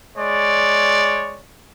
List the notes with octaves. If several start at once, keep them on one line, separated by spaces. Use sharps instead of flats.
G#3 C#5 D5